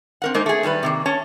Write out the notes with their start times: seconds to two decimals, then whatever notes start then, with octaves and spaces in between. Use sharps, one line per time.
0.22 C4 A#4 F#5
0.34 G#3 A#3 D#4 A#4 C5
0.46 A3 G#4
0.63 D#3 G3 G4 B4
0.83 C3 D#3 A#3
1.06 C#4 C#5 A5